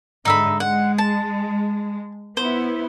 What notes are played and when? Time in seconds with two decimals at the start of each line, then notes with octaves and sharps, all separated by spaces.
0.25 G#2 D3 D#4 E5 B5
0.60 G#3 F#5
0.98 A5
2.37 B3 E4 C5